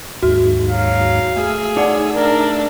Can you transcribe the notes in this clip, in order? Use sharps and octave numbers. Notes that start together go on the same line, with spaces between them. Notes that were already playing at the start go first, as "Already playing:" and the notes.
D#2 G#2 F#4
F#3 F5
A3 G#4 E6
D#4 D5 F#5
D4 A#4